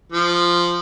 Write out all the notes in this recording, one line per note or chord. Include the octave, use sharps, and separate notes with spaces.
F3